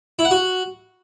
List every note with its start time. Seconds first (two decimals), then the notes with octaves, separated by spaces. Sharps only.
0.19 E4
0.25 F#5
0.31 F#4